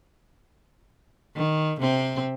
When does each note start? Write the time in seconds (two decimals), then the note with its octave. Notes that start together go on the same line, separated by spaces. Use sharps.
1.36 D#3
1.80 C3 C4